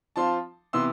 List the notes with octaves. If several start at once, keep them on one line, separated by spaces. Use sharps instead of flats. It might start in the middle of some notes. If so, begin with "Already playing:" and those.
F3 C4 F4 A5 C6
C3 E3 B3 C6 E6